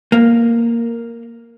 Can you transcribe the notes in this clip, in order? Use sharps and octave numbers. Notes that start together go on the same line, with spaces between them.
A#3